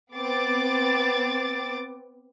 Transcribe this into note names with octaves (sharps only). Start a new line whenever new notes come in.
B3 C4 D6 A6